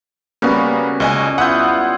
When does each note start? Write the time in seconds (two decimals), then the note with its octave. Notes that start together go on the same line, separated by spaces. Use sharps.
0.42 C#3 G3 A#3 B3 F#4
1.00 C#2 D#5 G#5
1.38 B3 E4 F4 F#5 G6